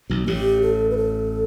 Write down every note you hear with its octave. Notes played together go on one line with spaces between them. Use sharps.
B1 B2
A1 A2 G4
A4
B4
A4